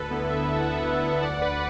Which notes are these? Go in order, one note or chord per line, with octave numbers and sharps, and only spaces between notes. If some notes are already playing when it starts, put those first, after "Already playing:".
Already playing: D2 A4 B4
D3 B3 E4 B4
B4 E5
D2 A5
F#5
E5 A5
D3 B3 E4
D2 D5 F#5
B4